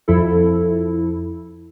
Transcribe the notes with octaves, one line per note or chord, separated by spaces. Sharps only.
F2 F3 E4 A4